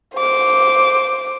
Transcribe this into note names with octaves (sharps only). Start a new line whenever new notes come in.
C5 D6